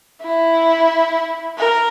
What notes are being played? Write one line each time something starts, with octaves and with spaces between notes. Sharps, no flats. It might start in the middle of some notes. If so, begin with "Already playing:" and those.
E4
A#4